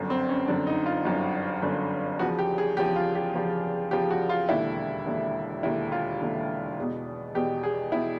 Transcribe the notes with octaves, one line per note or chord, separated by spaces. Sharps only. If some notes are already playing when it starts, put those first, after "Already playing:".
Already playing: G1 F#2 D3
C4
C#4
G1 F#2 D3 D4
D#4
F4
G1 F#2 D3
G1 F#2 D3
E2 C#3 F3 F#4
G4
G#4
E2 C#3 F3 G4
F4
G4
E2 C#3 F3
E2 C#3 F3 G4
F#4
F4
E1 D#2 D3 E4
E1 D#2 D3
E1 D#2 D3 E4
F4
E1 D#2 D3
E2 B2
E2 B2 G4
G#4
B2 E4